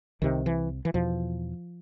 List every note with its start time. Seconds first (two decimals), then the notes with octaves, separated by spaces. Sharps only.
0.22 C2 C3 D#3
0.46 E3
0.85 E3
0.94 E2 B2 F3